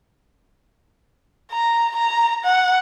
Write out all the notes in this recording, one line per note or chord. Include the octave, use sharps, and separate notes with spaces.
A#5
A#5
F#5